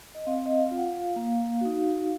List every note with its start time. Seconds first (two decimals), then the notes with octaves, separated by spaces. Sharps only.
0.15 D#5
0.27 C4 F5
0.46 D#5
0.57 F5
0.71 F4
0.78 F#5
0.86 F5
1.16 A#3
1.61 D#4 F#4